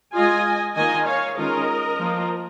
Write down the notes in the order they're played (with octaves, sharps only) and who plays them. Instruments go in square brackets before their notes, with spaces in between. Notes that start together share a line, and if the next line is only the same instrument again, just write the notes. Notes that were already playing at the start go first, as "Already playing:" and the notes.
[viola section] G#3 F4 D#5 G#5
D#3 A#3 F4 D#5 G#5
C#5 F5
D#3 G#3 C#4 F4 A#4 D#5
F3 A#3 F4